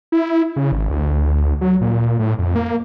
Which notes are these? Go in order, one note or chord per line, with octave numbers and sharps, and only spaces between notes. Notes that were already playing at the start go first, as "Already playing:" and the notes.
E4
C#3
G#1
D2
F#3
A#2
A2
F2
A#3